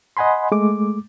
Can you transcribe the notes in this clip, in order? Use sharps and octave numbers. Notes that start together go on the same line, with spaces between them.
D#5 F#5 G#5 B5 C6
G#3 A3 D6